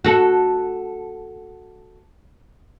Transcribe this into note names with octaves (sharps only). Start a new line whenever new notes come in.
F#4 A4